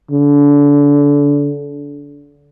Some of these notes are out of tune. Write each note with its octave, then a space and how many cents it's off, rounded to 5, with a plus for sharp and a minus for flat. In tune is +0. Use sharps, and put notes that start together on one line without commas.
D3 -30